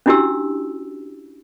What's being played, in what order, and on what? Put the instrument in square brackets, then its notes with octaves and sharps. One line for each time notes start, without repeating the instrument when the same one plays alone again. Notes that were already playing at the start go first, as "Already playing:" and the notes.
[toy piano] C#4 D4 E4 F#4 G4 E6